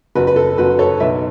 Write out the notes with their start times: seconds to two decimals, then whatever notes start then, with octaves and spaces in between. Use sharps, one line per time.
0.15 F#1 F#4 B4
0.27 B4
0.36 A4
0.58 F#1 F#4 B4
0.79 A4 C#5
1.00 B1 B4 E5